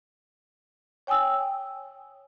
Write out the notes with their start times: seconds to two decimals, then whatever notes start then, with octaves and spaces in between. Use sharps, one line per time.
1.07 C#5 G5 G#5 D#6 E6